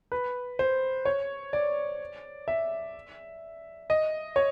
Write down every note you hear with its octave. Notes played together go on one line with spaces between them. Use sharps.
B4
C5
C#5
D5
E5
D#5
C#5